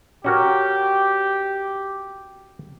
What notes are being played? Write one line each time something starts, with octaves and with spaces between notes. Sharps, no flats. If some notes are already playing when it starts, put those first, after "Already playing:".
C#4 F#4 G4 A#4